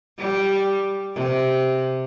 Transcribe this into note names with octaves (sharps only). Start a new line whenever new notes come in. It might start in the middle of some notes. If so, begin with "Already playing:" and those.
G3
C3